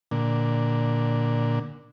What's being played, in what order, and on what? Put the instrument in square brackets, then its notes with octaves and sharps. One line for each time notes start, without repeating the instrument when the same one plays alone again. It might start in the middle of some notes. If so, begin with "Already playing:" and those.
[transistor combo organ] A#2 D3